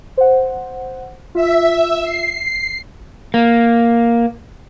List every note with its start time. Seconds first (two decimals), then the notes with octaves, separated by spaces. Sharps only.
0.17 C5 F#5
1.35 F4 E5
2.03 C7
3.34 A#3